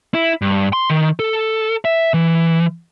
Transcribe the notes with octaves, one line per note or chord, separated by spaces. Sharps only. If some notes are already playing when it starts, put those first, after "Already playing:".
E4
G2
C6
D#3
A4
E5
E3